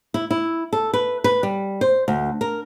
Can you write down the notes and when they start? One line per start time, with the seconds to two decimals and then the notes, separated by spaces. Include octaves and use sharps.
0.14 E4
0.31 E4
0.73 A4
0.94 B4
1.24 B4
1.43 G3
1.81 C5
2.08 D2
2.41 A#4